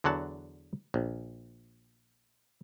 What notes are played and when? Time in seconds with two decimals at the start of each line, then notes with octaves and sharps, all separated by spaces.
0.04 E2 D3 F#3 F#5 A5
0.94 A#1